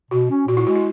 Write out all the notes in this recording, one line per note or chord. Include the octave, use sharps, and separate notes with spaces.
B2 F#4
C#4
A#2 F#4
E4
G#3 F#4
E4